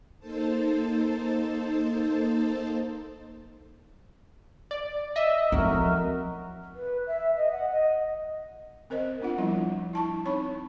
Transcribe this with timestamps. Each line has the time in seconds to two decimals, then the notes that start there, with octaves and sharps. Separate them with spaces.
0.19 A#3 D#4 A4 C5 A5
4.71 D5
5.16 D#5 E5
5.52 A2 F3 C4 F#4 A#4
6.75 B4
7.07 E5
7.37 D#5
7.52 F#5
7.71 D#5
8.90 C4 A#4 C5 D#5
9.21 B3 D4 F4 F#5
9.38 F3 G3 D4 E4 F4
9.93 E4 A5 C#6
10.25 C4 D#4 C#5 B5 C#6